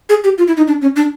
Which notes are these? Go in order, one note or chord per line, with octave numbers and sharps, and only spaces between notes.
G#4
G4
F4
E4
D#4
D4
C#4
D4